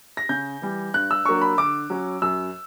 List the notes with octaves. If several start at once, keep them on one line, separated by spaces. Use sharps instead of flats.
A#6
C#3 G6
E3 G3
G2 F#6
E6
F#3 A#3 D4 C#6
B5
D3 D6
F#3 C#4
F#2 E6